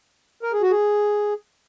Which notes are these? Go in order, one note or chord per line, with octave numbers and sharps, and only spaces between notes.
A#4
G#4
F#4
G#4